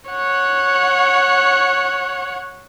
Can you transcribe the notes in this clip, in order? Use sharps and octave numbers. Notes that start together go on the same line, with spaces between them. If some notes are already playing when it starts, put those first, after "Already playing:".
C#5 F#5